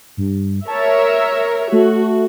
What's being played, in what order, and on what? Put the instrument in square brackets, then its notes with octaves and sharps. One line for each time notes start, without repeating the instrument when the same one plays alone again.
[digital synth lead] G2
[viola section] A#4 C#5 E5 [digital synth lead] A5
[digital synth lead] E6
[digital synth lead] A3 [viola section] F#4